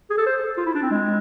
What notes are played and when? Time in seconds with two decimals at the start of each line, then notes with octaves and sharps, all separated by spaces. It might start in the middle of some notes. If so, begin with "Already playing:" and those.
0.10 G#4
0.18 A4
0.26 C5
0.58 F4
0.66 E4
0.75 D4
0.82 C4
0.91 G#3